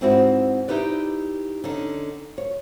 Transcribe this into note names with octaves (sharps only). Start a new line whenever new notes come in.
G#2 C4 E4 F#4
D#4 E4 G4 B4 D5
D3 C#4 D#4
C#5